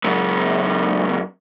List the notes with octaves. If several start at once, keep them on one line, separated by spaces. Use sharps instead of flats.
C#2 F#2